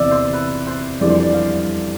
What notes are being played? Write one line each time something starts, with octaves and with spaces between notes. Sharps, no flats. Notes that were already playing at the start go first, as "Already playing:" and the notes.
Already playing: E2 C3 E3 B3 D5 E5
C5
B4
C5
F2 E3 G3 D4 A4 D5
C5
D5
F5